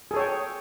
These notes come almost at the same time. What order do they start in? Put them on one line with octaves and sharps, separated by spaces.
G#4 A4 C#5 G5